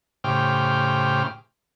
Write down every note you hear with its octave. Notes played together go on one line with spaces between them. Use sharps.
A2 C#3 G4 C5 G5 F6